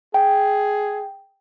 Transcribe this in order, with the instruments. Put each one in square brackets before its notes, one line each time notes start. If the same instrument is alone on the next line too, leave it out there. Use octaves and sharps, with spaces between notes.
[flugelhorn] G#4 [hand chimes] G5